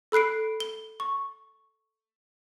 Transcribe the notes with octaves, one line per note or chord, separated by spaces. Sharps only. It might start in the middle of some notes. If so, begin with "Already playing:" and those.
A4 B5 F#6 C7 D7
G7
C#6